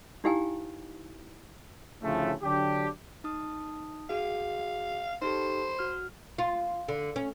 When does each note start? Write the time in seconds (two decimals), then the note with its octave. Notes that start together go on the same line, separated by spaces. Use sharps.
0.24 D#4 E4 G4 F5 G5 G#5
2.02 D2 A2 C#3 F3 A3
2.42 D3 F#3 D4 G4
3.24 D#4 D#6
4.10 F#4 G#4 F5
5.22 D#4 G4 A4 C5
5.79 F#4 F6
6.38 F4
6.88 D3
7.16 C#4